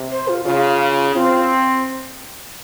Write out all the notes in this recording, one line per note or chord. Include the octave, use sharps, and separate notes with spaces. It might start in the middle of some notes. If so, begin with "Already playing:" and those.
Already playing: C3
C5
F4
C#3 F4
C4 F4